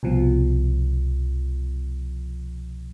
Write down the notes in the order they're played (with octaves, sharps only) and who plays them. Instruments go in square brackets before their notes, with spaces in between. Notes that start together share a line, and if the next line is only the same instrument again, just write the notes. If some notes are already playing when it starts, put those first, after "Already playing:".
[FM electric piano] C2 B2 F3